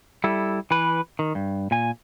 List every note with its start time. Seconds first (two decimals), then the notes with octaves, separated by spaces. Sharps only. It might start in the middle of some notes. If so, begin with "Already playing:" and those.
0.24 G3 E4 A4
0.71 E3 B4
1.19 D#3
1.35 G2
1.71 A#2 G#5